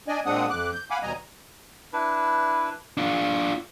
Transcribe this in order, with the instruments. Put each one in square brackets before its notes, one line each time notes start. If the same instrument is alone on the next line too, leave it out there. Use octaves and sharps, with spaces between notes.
[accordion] D4 D5 D#5 G#5
A#2 G#3 C4 D4 F#5 D#6
F2 D6 F#6
G6
F5 F#5 G#5 B5 D6
D#2 B2 G3 D#5 G#5 A#5
[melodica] D4 E4 B4
[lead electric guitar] D4 F4